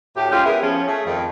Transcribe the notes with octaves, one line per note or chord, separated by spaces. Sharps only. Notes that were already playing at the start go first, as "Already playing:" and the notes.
D2 A2 G4
G#3 C#4 F4 G4
B3 E4 G#4 A#4
F3 C#4
A3 G#4
F2 D#3